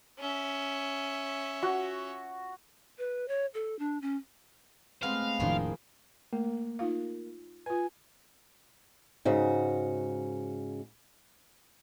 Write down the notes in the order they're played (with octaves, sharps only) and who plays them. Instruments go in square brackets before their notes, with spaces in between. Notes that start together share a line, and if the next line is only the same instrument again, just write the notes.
[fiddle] C#4 E5
[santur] F#4
[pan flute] B4
C#5
A4
D4
C#4
[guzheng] G#3 B3 [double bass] A3 C4 [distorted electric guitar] F5
[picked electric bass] E1 A2 D4 [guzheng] D#3 G#3 A#3 [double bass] F3 E4
[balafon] A3 [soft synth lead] A#3
[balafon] D#4 F4 F5
[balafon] F4 B4 [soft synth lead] G#5
[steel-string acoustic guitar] G#2 C#3 F#4